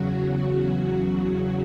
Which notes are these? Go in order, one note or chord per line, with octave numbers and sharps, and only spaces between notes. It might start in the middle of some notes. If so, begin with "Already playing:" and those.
Already playing: E2 C#3 F#3 F#4
F#4